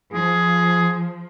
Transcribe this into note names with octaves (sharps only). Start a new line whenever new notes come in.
F3 G#4